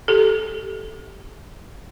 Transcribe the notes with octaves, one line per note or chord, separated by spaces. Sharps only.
G4 A4